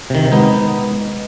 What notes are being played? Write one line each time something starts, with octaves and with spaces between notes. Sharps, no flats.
C3 D#3
G#3 B3 D#4